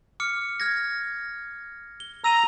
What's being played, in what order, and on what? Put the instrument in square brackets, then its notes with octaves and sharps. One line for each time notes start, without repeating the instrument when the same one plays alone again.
[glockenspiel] D6 F6 C#7
F6 G#6 A#6
G7
[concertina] A#5 [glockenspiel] E6 D#7 F7